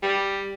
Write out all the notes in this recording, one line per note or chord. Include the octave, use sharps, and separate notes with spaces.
G3